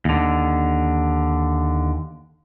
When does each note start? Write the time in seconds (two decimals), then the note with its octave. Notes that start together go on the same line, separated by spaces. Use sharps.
0.05 D#2 D3